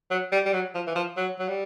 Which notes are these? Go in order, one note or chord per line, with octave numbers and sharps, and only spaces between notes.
F#3
G3
G3
F#3
F3
E3
F3
F#3
F#3
G3